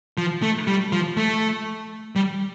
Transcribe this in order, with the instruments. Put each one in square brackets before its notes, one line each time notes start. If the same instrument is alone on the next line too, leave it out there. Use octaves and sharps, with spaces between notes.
[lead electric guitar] F3
A3
G3
F3
A3
G3